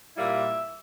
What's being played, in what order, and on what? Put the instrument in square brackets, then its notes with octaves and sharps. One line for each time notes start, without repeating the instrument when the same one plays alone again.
[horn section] A#2 G3 A#3 E4 E5